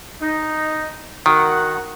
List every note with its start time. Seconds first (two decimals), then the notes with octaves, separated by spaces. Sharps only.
0.21 D#4
1.26 D#3 F#4 A#4 F#5